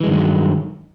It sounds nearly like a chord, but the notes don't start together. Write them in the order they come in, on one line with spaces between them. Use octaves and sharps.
E3 G#3 G2 D#3 F#3